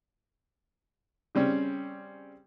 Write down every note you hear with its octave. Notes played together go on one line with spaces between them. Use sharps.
C#3 G3 C4 C#4